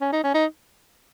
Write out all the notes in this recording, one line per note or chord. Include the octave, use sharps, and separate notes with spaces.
C#4
D#4
C#4
D#4